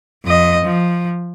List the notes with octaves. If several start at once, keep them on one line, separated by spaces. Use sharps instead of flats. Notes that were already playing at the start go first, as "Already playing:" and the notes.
F2 D#5
F3